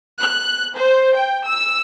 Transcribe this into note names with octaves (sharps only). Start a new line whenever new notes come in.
F#6
C5
G5
E6